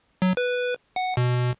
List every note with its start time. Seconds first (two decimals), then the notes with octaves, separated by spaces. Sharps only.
0.22 F#3
0.37 B4
0.96 F#5
1.17 B2